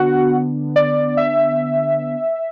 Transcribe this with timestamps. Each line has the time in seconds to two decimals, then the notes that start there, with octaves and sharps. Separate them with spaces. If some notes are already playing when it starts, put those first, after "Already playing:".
Already playing: D3 B3 D4 F#4 F#5
0.76 D5
1.17 E5